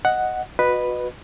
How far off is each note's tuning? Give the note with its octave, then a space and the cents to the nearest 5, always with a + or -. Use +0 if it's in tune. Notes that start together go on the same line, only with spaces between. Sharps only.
D#5 +0 F#5 +0
F#4 -25 B4 +0 D#5 -25